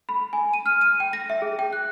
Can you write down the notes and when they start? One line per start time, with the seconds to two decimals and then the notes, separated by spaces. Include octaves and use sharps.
0.09 B5
0.33 G#5
0.53 D#7
0.66 F6
0.81 D#7
1.00 G5
1.13 A#6
1.30 E5
1.42 G#4
1.59 G5
1.73 F#6